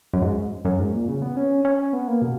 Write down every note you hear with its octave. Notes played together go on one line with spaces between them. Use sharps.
F#2
G#2
F#2
G#2
A#2
C#3
B3
C#4
C#4
B3
A#3
B2